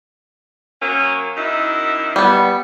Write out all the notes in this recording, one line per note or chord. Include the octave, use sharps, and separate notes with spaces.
F#3 A#3 C#4
F#2 D#4 E4
G3 B3